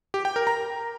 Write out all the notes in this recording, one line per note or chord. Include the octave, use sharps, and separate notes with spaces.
G4
G5
A#4
A#5